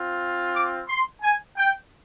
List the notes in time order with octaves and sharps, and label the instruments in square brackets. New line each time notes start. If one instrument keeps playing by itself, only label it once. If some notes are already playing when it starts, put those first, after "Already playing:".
Already playing: [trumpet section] C4 F4
D6
C6
G#5
G5